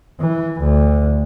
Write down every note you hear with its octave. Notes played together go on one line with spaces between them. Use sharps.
E3
D2